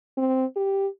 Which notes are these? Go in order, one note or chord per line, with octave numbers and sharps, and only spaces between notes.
C4
G4